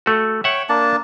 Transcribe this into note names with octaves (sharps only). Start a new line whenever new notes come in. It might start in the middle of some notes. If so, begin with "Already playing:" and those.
A3 F#4
C#5 E5 F#5 G5
A#3 D4 A5